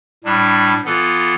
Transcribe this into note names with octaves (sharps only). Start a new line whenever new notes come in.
A2 G3 D4
E3 B3 F4 A4